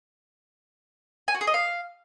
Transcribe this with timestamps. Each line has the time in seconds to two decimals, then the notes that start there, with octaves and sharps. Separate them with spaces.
1.28 G#5
1.34 F#4
1.41 G#4
1.47 D#5
1.54 F5